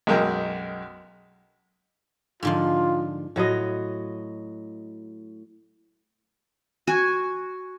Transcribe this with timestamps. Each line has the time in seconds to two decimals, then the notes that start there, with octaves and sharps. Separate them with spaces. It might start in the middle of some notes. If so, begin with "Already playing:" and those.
0.07 B1 F#2 G#3 A#4 G5
2.43 G#2 D3 F3 F4
3.36 A2 F#3 F4 D#5
6.87 F#4 G#5